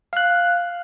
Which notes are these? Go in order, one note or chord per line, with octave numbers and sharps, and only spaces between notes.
F5 F#6